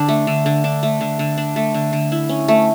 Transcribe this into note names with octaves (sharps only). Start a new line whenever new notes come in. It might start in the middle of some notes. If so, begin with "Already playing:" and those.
Already playing: D3 D4
A3
D3
D3
D4
A3
D3
D3
D4
A3
D3
D3
E4
C#4
A3